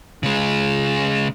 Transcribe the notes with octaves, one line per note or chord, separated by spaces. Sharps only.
C#3 G#3